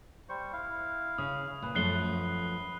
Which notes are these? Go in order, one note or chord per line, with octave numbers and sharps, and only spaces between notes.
G3 C5 C#6
E4 F5
C#3 D#6
A#2 B4
F#2 F3 A3 F#6 C7 G7